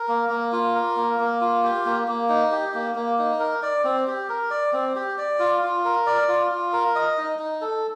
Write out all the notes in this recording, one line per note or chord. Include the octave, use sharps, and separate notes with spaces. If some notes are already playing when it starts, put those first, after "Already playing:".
Already playing: A#4
A#3
A#3
F4
A#4
A#3
A#3
F4
G4
A#3
A#3
D#4
G4
A#3
A#3
D#4
A#4
D5
C4
G4
A#4
D5
C4
G4
D5
F4
F4
A#4
D5
F4
F4
A#4
D#5
D#4
D#4
A4